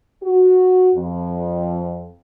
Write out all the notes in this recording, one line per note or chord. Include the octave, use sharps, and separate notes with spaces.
F#4
F2